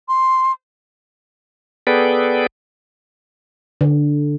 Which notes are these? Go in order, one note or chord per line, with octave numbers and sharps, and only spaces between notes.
C6
B3 G#4 A4 B4 D5 G5
D3